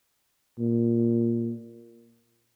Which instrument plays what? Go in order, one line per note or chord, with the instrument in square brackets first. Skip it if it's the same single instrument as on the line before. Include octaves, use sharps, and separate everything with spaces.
[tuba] A#2